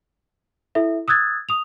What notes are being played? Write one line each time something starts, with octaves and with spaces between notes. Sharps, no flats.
E4 A4 E5
D#6 E6 F#6 G#6 A6
D#6 F7